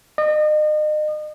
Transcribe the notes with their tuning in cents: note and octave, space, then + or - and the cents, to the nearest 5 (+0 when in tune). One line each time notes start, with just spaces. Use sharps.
D#5 -35